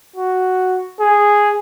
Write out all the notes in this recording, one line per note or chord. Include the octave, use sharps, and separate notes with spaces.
F#4
G#4